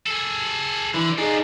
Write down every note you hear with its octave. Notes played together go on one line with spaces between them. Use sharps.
G#4 A4
D3 E3
D4 D#4 F4 G#4